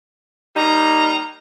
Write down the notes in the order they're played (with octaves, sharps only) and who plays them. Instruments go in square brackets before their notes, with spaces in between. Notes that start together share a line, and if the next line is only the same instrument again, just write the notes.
[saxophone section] G3 A#3 D#4 [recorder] A#5